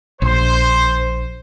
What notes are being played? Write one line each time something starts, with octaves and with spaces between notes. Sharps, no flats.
A#1 C5